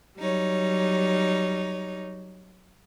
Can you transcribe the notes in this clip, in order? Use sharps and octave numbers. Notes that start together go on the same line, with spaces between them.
F#3 G3 D#4 C#5